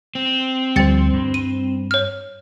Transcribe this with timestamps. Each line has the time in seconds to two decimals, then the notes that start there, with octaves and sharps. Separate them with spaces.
0.15 C4
0.76 D2 F3 G3 C5 G5 A6 C#7
1.13 G2
1.34 D#7
1.91 C#5 F6